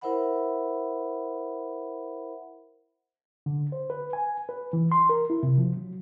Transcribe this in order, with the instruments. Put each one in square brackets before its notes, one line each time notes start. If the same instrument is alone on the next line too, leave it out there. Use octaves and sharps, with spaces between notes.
[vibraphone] E4 A#4 C5 E5 F#5 B5
[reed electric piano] D3
C5
B4
G#5
B4
E3
C6
A#4
E4
C3
F3
F#3